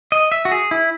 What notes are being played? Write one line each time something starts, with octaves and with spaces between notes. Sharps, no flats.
D#5
E5
F#4
G#4
E4